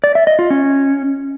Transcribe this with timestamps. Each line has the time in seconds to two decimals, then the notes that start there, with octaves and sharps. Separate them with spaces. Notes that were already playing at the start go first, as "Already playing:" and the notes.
0.04 D5
0.15 E5
0.27 D#5
0.39 F4
0.50 C#4